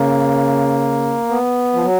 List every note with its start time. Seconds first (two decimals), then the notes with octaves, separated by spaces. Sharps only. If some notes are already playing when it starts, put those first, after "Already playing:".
Already playing: C#3 A#3
1.29 B3
1.73 F3
1.83 F#3